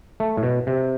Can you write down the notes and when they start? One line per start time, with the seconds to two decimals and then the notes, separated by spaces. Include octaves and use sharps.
0.20 A3
0.37 A2
0.43 B2
0.67 C3